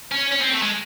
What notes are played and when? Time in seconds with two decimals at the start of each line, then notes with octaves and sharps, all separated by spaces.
0.12 C#4
0.32 C#4
0.42 C4
0.52 A3
0.62 G#3